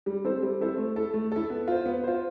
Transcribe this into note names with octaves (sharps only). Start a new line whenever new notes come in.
G3
C4 E4 A4 C5
G3
C4 E4 A4 C5
A3
E4 A4
A3
E4 A4
B3
F4 C5
B3
F4 C5